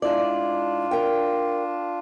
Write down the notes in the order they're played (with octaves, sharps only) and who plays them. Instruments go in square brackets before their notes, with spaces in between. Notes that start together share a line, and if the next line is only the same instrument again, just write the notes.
[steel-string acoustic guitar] G#2 E4 D5 [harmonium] D4 F4
[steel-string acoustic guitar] A#4 G5